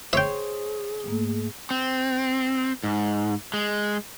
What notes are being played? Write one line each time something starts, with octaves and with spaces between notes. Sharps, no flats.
G#4 C5 C#5 E5 G5
G#2 A3 A#3
C4
G#2
G#3